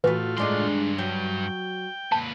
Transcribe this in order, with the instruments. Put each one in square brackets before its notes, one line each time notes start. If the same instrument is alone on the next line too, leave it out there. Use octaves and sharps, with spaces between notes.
[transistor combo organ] A2 F4 [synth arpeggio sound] E3 [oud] F#4 B4
[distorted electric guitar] G2 C6 [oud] G#3 D4 D#4
[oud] F#3 [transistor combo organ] G5
[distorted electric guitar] A#2 B4 [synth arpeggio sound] A5